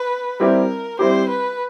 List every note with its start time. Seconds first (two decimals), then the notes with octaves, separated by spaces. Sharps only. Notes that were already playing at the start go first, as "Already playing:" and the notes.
Already playing: B4
0.40 G3 C4 E4 G4 A#4
0.99 G3 C4 E4 G4 C5
1.29 B4